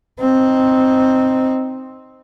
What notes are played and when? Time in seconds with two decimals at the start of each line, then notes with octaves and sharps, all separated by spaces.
0.19 C4 D#4